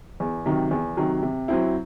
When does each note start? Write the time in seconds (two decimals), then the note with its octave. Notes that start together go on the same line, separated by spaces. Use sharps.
0.20 E2
0.46 C3 D#3 F#3
0.71 E2
0.97 C3 D#3 F#3
1.22 C3
1.48 F#3 C4 E4